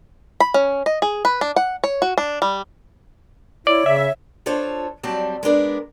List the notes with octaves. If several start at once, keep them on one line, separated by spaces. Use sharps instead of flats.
B5
C#4
D#5
G#4
B4
D4
F#5
C#5
F#4
D4
G3
E4 C#5 D5
C#3 E5
D4 F4 A4 C5 C#5
F#3 G3 C4 D5 A5
G#3 B3 D4 A#4